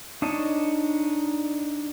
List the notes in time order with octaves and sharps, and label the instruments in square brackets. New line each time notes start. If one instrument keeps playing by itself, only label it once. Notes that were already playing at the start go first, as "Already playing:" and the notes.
[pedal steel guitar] D4 D#4 C#5 D#5 A5